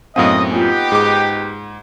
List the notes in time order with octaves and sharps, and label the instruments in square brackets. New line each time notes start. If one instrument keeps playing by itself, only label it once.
[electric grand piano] F#2 A2 C4 [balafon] B3 F5 F#5 [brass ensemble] D#5
[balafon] A#3 F4 [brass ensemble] B3 D#4 G4
[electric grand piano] G#2 D6 [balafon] G#4 G5